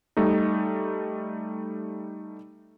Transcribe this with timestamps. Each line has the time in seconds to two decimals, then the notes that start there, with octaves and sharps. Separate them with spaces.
0.17 G3 A3 D#4